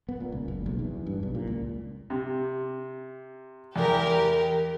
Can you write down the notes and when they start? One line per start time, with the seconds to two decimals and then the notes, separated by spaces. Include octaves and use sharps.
0.09 B3
0.20 A#2
0.32 C#2
0.48 F#1
0.66 B1
0.79 E2
1.06 G2
1.23 B1
1.35 A#2
1.47 C#2
2.10 C3
3.76 E2 G4 A#4